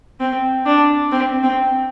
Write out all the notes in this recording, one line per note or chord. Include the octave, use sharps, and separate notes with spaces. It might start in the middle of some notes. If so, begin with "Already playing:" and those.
C4
D4
C4
C4